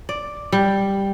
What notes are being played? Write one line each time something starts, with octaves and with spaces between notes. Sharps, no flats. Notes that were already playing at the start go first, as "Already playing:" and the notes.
D5
G3